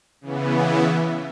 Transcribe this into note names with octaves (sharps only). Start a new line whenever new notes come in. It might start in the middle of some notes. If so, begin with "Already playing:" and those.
C#3 E3 B3
E4 E5